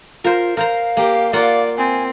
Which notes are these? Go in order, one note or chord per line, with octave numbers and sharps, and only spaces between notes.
F4 A#4 C5
A#4 C5 F5 A#5
A#3 G4
A#3 F4 D5 F#5
C4 G#5